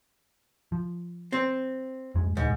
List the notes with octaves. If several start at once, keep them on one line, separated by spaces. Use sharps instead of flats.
F3
C4
F2 G#2 G#3
D#1 C#2 G#2